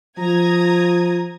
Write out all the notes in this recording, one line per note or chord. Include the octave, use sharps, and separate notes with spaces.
F3 A#5 D#6 G#6